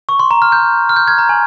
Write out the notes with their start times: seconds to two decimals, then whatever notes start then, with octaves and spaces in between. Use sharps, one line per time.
0.09 C#6
0.20 C6
0.31 A#5
0.42 F6
0.52 G6
0.89 F6
0.96 G6
1.08 F6 G#6
1.18 A#5
1.29 G#5